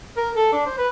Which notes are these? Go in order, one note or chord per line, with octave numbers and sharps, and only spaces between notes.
A#4
A4
D4
C5
B4